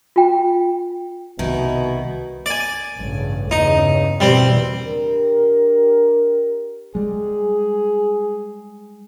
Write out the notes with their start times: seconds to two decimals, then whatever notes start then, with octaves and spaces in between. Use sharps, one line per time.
0.16 F4 G5
1.39 C2 B2 D#3 E4
2.46 D5 G#5
2.97 A1 G2 C#3
3.51 E2 G2 C#3 D#4
4.20 B2 E3 G3 C4
4.82 D4 G4 A#4
6.95 G3 G#3 G#4